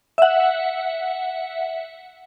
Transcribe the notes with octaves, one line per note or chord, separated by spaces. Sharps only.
E5 F#5